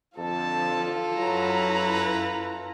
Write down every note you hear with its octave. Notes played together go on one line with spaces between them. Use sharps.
F2 D3 F3 F4 A4 A5
F#2 F#3 E4 B4 A#5